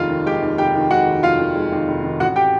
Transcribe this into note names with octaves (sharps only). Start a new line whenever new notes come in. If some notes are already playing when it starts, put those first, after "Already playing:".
Already playing: F1 D#2 G#3 F4 F5
D#3
G#3 G4 G5
D#2
F1 G4 G5
D#3
G#3 F#4 F#5
D#2
F1 F4 F5
D#3
G#3
D#2
F1
D#3
A1 F#4 F#5
G4 G5